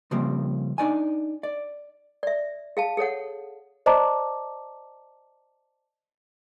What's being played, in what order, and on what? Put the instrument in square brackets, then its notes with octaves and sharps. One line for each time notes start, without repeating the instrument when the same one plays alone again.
[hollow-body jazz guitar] C#3 F3 G3 A#3 C4
D4 D#4 D5 G#5
D5
[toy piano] D5 E5
G#4 F5 A5
G#4 A4 C#5 F#5
[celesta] C5 D5 D#5 A5 A#5 D6